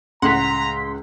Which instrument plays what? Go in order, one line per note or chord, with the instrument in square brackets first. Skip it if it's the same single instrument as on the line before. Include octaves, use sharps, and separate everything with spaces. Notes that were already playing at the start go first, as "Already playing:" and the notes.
[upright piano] C#2 [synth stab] A2 F#5 [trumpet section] A#5 [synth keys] C6 B6